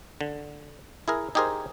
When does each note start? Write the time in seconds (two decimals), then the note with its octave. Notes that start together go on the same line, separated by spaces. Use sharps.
0.21 D3
1.08 E4 G#4 A#4
1.35 D#4 G4 G#4 A#4 C5